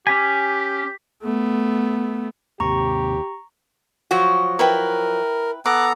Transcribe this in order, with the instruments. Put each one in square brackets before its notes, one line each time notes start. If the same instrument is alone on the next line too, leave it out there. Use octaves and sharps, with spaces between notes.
[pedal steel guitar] C#4 G#5 [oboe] G4 [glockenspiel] D6 B6
[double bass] A3 B3
[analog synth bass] D#2 [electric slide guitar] G#2 C3 [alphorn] G4 [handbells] A#5 C#6
[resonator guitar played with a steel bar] F3 F#3 F#4
[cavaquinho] E4 B4 G5 [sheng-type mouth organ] A#4
[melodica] B3 A4 A#5 [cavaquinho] D6 [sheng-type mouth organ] F#6